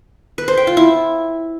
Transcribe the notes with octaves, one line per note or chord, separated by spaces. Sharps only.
B4
C5
G5
F4
E4